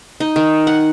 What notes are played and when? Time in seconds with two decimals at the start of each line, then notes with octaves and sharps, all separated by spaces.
0.20 D#4
0.36 D#3
0.67 F#5